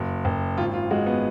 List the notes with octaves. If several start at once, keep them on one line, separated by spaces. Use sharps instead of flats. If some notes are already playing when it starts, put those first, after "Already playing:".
Already playing: F#1
F#1
G#1 F4
F4
G#3 F#4
B3